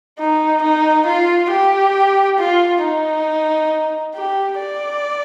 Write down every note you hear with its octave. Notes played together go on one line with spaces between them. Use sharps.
D#4
D#4
F4
G4
F4
D#4
G4
D5